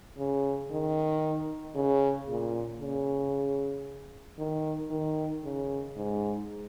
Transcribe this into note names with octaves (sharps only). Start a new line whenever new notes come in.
C#3
D#3
C#3
A#2
C#3
D#3
D#3
C#3
G#2